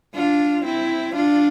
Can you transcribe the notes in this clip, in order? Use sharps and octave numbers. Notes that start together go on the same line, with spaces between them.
D4 F4
C4 E4
D4 F4